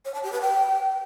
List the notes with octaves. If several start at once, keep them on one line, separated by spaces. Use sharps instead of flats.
C#5
A5
G4
B4
G5